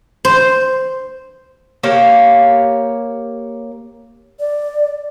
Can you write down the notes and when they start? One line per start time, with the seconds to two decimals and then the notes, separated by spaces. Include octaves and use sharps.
0.25 C5
1.83 A#3 G4 C#5 F5
4.40 D5